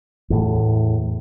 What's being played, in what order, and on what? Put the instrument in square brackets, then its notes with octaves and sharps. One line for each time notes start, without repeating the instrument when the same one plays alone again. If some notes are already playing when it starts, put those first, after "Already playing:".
[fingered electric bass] E2 A2